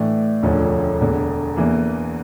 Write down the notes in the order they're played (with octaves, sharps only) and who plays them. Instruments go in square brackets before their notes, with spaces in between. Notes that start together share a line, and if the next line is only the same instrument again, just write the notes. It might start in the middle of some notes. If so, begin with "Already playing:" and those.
Already playing: [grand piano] A2 E3 A3 D4
E1 D2 D3 F3 C#4
E1 E2 D3
E2 E3 A#3